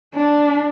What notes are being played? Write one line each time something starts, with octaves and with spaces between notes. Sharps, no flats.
D4